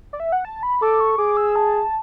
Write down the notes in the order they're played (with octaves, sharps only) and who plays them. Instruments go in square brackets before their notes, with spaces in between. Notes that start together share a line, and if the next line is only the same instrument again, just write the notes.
[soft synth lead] D5
E5
F#5
A5
B5
[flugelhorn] A4 [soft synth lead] D6
[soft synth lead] C#6
[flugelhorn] G#4 [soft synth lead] D6
[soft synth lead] E6
A5